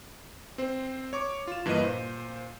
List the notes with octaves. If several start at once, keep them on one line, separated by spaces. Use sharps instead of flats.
C4 C5
C#5 C#6 D6
F4 E7
G2 E3 A#3 A#4 D#5 D#7
A#2 C5